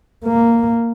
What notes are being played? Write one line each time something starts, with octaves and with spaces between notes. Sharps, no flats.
A#3